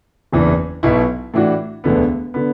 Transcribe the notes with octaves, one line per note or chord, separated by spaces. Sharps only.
F#1 E2 E3 D4
B1 B2 B3 E4
A2 E3 D4 F#4
E1 D2 D3 B3
D3 B3